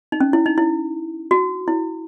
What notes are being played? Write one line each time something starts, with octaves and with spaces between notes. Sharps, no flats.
D#4
C#4
E4
D#4
E4
F#4
E4